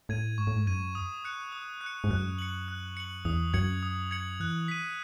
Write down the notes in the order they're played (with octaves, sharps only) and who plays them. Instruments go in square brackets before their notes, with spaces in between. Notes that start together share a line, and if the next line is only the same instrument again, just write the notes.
[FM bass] A2 [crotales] G#6 D#7
[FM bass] G#2 [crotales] C#6
[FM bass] A2
G#2
[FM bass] F#2 [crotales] G#6 D#7
[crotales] D#6
F#6 C#7
D#6
F#6
C#7
[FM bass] G#2
[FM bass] F#2 [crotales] F#6
[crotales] C#7 F#7
F#6
C#7 F#7
[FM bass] E2 [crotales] D#6
[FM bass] F#2 [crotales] G#6 C#7 F#7
[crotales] D#6
G#6 C#7 F#7
[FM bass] E3 [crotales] F#6
[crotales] B6 D#7